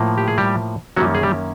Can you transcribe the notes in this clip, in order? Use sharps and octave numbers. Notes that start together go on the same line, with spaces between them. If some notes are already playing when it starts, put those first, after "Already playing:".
Already playing: A2 F3 A#3
G4
G#4
G3 G4
F#2 D#3 F#3 G3 A#3 C#4 F#4
G#4
G3 G4